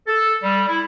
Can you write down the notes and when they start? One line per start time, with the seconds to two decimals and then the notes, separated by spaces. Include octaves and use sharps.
0.07 A4
0.43 G3
0.68 E4